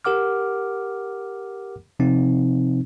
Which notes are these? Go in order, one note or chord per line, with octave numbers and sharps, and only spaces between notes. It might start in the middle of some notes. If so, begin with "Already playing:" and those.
G4 A#4 F#5 D6 F6
C3 F3 C4 D#4